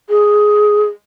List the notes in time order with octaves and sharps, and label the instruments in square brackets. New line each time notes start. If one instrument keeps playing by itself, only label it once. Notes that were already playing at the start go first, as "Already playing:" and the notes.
[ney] G#4